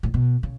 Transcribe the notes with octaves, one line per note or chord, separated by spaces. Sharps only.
A2
B2
C#3